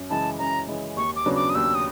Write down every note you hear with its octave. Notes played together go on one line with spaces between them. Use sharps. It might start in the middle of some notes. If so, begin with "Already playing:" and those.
Already playing: F#2
C#3 E3 G#3 A5
F#2 A#5
C#3 E3 G#3
D#2 C#6
D6
C#3 F#3 B3 D4
D6
D#6
D#2 E6
D#6